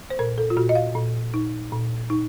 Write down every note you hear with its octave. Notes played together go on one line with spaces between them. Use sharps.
C5
A#2 A#4
A4
F4
A#2 F#4
D#5
F5
A#2
D#4
A#2
D#4